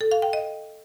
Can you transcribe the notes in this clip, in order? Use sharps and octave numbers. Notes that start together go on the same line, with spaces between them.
A4
F5
G5
D#5